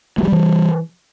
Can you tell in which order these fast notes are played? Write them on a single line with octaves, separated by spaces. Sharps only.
A3 F#3 G3 E3